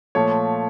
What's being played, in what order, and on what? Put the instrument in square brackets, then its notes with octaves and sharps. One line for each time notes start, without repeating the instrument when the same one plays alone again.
[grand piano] A#2 F3 A3 C#5